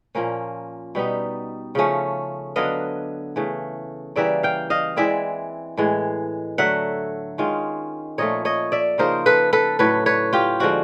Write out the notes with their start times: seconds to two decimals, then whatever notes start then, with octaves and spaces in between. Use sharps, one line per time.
0.15 A#2 F3 A#3 C#4
0.95 B2 G3 B3 D#4
1.75 C#3 F3 A3 C#4
2.56 D3 F#3 B3 D4 D#5 F5
3.36 C#3 E3 A3
4.16 C#3 E3 G3 A#3 D5 E5
4.43 F5 G5
4.70 D#5 F5
4.96 E3 G#3 C4 E4 D5 E5
5.77 A2 E3 G#3
6.58 D3 F#3 A3 E5 F#5
7.38 D#3 G#3 C#4 F4
8.18 A#2 F3 A3 C#5 D#5
8.45 C#5 D#5
8.72 D5 E5
8.98 C#3 F3 A#3 D#4 A#4 C5
9.26 A4 B4
9.53 A4 B4
9.79 A2 F#3 A3 B4 C#5
10.06 B4 C#5
10.33 F4 G4
10.60 D3 F3 G#3 C4 F#4